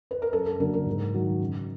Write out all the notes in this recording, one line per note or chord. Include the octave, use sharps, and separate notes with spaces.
B4
A#4
F#2 A4
A4
D3 F#3 A#3 A#4
A#4
G#2
D#3 F#3
C#3